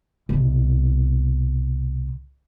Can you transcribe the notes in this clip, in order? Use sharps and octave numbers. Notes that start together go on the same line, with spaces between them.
C2 B2